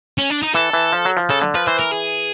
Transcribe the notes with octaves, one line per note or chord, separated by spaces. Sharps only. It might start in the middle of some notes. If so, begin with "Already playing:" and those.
C#4
D4
D#4
E3 A4
E3
F3
F#3
F3
C#3 A4
D3
F3 B4
E3 C5
A#4
G#4